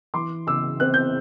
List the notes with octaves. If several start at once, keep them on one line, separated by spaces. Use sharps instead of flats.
E3 C6 D6
C#3 D6 E6
C4 F#6
G6